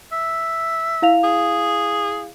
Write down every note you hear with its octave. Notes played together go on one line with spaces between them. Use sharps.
E5
E4 F5 F7
G#4